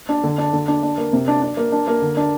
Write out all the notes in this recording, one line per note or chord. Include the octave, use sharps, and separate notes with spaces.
D4
D3
D4
D3
D4
D4
A#3
C3
D4
D4
A#3
D4
A#3
D3
D4